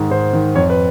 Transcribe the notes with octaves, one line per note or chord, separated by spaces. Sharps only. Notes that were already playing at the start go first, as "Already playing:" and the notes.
Already playing: G#2 D#3 G#4
G#2 C5
D#3
F2 C#5
B4